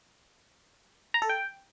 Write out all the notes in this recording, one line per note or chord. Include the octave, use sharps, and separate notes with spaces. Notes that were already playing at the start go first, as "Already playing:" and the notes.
A#5
A4
G5